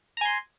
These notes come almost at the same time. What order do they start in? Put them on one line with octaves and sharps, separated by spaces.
A#5 G#5 C6